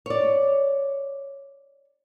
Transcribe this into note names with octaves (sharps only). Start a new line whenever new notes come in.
C#5 D5